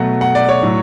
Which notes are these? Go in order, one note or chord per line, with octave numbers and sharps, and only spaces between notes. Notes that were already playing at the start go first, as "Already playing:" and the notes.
Already playing: B2 F#3 A3 F#5
F#5
D5
C#5
A2 F#3 A3